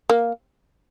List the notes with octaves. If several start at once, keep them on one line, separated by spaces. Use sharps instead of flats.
A#3